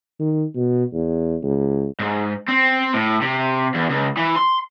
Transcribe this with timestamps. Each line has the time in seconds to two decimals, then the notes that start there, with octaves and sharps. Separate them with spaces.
0.19 D#3
0.55 B2
0.93 E2
1.43 C#2
2.00 G#2
2.48 C4
2.94 A2
3.22 C3
3.75 E2
3.90 C#2
4.17 E3
4.36 C6